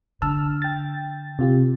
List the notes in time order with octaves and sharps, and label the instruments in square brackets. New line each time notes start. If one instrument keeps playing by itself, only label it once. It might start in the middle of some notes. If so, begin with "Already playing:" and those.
[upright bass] D3 [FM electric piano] A5 E6 F6
[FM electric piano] G5 A6
C3 F4 G4